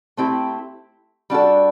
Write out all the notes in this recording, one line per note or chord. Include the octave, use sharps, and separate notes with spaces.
A3 C4 E4 G4
G3 D4 F#4 A4